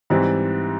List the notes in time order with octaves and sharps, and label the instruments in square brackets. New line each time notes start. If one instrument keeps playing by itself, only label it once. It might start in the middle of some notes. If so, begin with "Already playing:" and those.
[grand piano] G#2 E3 G3 C4